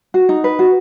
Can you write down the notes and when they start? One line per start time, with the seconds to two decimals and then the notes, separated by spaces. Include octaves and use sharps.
0.14 F#4
0.29 D#4
0.44 B4
0.59 F#4